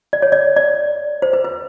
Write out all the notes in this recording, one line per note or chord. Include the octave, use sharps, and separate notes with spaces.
D5
C#5
D5
D5
C5
B4
B4